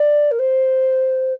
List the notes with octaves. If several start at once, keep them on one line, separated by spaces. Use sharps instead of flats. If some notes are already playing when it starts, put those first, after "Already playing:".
Already playing: D5
A#4
C5